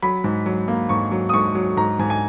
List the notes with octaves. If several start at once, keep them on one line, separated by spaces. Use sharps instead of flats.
F#3 B5
G#2
F#3
A#3
G#2 C#6
F#3
D#6
G#2 C#6
F#3
G#2 A#5
G#2 G#5
G#5